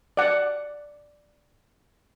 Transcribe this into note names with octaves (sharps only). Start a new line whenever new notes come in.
D5 F#5